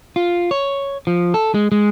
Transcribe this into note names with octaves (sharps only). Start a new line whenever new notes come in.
F4
C#5
F3
A4
G#3
G#3